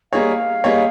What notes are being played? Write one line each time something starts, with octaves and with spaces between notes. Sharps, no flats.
G3 A#3 D#4 G#4 C#5 F5
G3 A#3 D#4 G#4 C#5